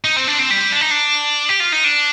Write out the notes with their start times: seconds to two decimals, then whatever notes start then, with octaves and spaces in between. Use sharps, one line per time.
0.05 D#4
0.16 C4
0.27 D4
0.39 C4
0.51 G3
0.72 D4
0.81 D#4
0.91 D4
1.49 G4
1.60 F4
1.72 D#4
1.84 D4